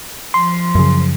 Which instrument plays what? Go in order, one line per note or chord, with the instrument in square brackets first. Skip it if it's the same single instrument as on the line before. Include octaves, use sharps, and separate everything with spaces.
[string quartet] F3 [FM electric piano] C6
[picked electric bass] F#2 C#3